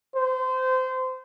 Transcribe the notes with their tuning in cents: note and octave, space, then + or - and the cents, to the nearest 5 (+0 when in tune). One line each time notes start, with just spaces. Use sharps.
C5 -25